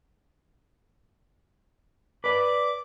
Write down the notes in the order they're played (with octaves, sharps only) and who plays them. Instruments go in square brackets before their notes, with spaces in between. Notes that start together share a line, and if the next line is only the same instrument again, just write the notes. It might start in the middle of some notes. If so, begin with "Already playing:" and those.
[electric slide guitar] B4 D5 [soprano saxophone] D6